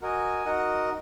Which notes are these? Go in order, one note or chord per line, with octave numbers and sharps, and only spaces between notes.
F#4 A#4 D#5 G#5
D#4 F#4 A#4 D#5 F#5